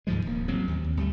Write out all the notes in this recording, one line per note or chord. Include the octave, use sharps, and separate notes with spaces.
D2 G#2 F3 G#3
D1 D#2 A#3
A1 F#3 C4
D#2
D#2
D2 G3 A3